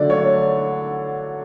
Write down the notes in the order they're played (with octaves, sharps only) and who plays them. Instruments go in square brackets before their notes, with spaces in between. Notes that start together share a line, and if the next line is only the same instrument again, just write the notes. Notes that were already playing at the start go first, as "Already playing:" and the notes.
Already playing: [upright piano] D3 F#3 A3 D5
C#5